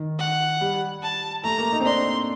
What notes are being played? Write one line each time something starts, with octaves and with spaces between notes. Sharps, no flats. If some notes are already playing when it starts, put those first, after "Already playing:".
Already playing: D#3
F#5
G3
A5
A3 A#5
A#3
D#4
C4
D4 C6